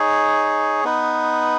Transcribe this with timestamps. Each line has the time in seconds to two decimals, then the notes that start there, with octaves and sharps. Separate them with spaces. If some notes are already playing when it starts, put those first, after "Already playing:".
Already playing: D#4 G#4 C#5
0.84 B3 D#4 B4